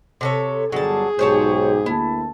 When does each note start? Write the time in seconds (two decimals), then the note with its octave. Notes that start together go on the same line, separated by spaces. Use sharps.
0.21 C3 A4 C#5
0.72 G1 F#3 G3 G#4 A5
1.19 B1 G#2 F#4 G4 C5 C#5 A5
1.86 D2 A#3 E4 A5